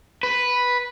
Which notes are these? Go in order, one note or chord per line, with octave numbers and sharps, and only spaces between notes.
B4